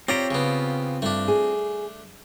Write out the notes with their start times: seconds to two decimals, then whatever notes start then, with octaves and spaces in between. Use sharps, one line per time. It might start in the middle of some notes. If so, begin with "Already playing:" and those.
0.08 C4 F4 G4 C#5 D5 A#5
0.31 C#3 B3
1.02 G2 A3 D4
1.28 G#4